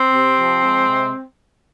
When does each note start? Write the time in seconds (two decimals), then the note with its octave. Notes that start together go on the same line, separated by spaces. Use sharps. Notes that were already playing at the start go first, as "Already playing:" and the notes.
Already playing: C4
0.12 C3
0.37 F3
0.63 G#3
0.87 C3